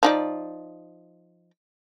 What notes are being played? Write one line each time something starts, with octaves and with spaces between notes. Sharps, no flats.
F3 D#4 D5